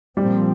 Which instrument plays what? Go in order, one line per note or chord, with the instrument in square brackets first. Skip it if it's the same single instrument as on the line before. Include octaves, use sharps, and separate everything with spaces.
[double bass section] A#2 F3 C4 [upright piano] G3